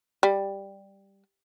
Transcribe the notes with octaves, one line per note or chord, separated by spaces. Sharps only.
G3